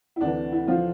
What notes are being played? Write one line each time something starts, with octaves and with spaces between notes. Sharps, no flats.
E4
D2 C3 E3 D4
E4
F3 F4